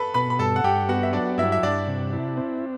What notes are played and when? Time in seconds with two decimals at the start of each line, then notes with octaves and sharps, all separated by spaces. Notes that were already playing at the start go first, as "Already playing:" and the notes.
Already playing: A4 B4 B5
0.14 B2 B4 B5
0.30 B5
0.39 G2 A4 A5
0.56 F#5
0.64 G2 G4 G5
0.89 B3 F#4 F#5
1.03 E5
1.13 F#3 D4 D5
1.38 G2 E4 E5
1.52 E5
1.63 G2 D4 D5
1.88 C3
2.13 E4
2.37 C4